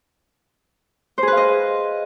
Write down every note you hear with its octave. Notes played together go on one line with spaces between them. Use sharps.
G#4 B4 C5 D#5 F5